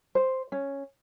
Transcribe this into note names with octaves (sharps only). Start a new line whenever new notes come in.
C5
C#4